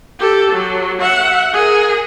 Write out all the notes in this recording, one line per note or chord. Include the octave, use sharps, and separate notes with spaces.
G4 A4
F#3
E5 F#5
G#4 A#4